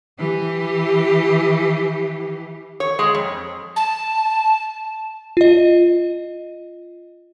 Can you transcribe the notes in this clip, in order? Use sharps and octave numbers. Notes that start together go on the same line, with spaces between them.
E3 G4
C#5
G#3
F2
A5
F4 D#5